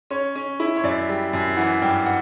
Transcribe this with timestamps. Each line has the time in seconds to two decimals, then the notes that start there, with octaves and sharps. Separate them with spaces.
0.10 C#4 C#5
0.36 C#4
0.60 E4
0.77 C#5
0.84 F#2 D5
1.09 G3
1.33 F#2
1.57 E3 F#5
1.82 G2 G5
2.06 F#5